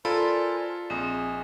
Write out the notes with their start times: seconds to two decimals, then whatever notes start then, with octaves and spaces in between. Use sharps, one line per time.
0.05 F4 A4 A#4 C5 D5 G#5 B5
0.90 A#1 C4 G#4 D#5